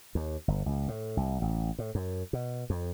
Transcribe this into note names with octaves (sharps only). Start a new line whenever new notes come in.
D#2
G1
C#2
A2
C2
A1
A2
F#2
B2
F2